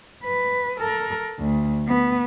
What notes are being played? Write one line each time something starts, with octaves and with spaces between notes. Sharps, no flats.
B4
A4 A#4
D2
B3